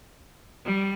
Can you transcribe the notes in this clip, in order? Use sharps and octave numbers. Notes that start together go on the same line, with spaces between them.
G3